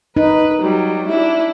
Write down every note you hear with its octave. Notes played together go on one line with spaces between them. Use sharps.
D#4 B4
F#3 G3
D4 E4